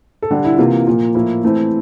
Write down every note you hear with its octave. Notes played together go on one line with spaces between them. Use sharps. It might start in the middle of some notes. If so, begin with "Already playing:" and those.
A4
D3 G3 D4 G4
E4
C3 E3 A#3 F4
A#2 F3 A#3
A2 F3 A#3 E4
E3 A3 C4 E4